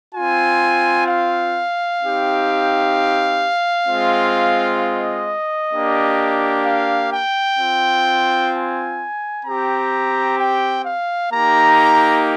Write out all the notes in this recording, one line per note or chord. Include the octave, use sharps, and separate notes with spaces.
C4 F4 G#5
F5
C4 D#4 G4
G#3 C4 F4
D#5
A#3 D4 G4
F5
G5
C4 F4
G#5
C4 G4 A#5
G5
F5
A#3 D#4 G4 A#5